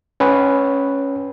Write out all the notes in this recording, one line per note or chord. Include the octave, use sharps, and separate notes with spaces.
C#4 B4